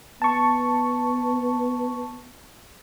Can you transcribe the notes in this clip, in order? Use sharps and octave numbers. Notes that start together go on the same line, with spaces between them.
B3 A5 C#6